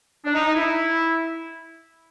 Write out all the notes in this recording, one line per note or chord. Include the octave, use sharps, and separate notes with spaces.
D4
D#4
D#4
E4